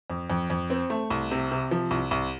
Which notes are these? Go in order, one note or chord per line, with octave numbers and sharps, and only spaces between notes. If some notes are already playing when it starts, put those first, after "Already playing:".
F2
F2
F2
C4
A3
C2
C3
C3
F3
C2
C2